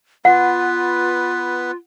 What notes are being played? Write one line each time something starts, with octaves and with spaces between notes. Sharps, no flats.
B3 F4 B4 F#5